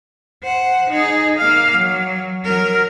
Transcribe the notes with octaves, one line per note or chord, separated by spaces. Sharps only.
C5 F#5
D#4 G#4
A#3 F5
F#3
F#3 A#4